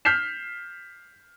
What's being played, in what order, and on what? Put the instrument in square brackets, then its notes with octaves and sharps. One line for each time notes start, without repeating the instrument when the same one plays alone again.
[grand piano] F6 G6 B6 C7 E7